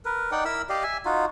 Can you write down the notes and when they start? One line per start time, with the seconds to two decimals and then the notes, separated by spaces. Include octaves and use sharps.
0.05 A#4 B4
0.32 D#4 D5 F#5 G5
0.45 E4 A#4 B5 E6
0.69 G4 D5 D#5 F5
0.83 E5 G#5
1.05 D#4 F4 F#4